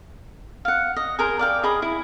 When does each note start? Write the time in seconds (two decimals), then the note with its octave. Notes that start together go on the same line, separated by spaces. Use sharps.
0.65 F5 F#5
0.96 D#5
1.19 G#4 A#4 C5
1.39 D5 F5 G5
1.64 G#4 D#5 B5 D#6
1.82 E4